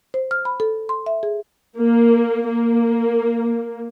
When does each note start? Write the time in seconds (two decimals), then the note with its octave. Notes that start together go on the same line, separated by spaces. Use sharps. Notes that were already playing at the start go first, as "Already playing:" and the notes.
0.14 C5
0.31 F6
0.45 B5
0.60 A4
0.89 C6
1.06 E5
1.23 G#4
1.78 A#3
2.47 A#3